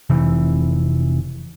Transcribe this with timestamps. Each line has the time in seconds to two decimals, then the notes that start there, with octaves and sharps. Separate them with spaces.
0.10 F1 C3 E3